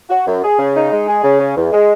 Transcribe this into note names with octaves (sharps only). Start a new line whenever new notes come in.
F#4
F#2
G#4
C#3
D#4
G#3
G#4
C#3
C#4
E2
G#3